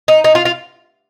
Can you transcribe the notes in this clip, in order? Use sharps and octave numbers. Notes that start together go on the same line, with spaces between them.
D#4
D#4
F4
F4